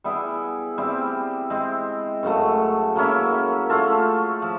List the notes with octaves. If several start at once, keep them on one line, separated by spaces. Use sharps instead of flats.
G3 B3 E4 G#4
G3 C4 E4 G4
G#3 C4 E4
F#2 C#3 F#3 A3
F#3 A#3 C#4 E4
A3 C#4 F4 A4
F3